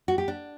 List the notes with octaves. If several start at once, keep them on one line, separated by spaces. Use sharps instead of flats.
F#4
G4
D4